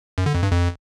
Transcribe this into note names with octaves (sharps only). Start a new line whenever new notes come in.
F#2
D3
F2
G2
F2